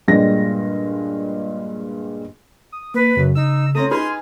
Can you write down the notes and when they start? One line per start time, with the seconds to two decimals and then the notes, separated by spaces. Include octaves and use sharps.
0.08 G2 A#2 G3 G#3 D4 A#6
2.72 D#6
2.94 A#3 B4
3.16 F#2 C#3
3.35 D#4 E6
3.75 A3 C4 C#4 A#5 D#6
3.91 D#4 G#4 B4 G#5 C6 F6